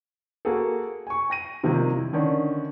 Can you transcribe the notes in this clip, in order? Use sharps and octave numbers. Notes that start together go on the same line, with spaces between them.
A#3 F#4 G#4 A4
G#5 C#6
G5 A#6 D#7
C3 D#3 F3 G3 A#3
E4
D3 D#3 C#4 D4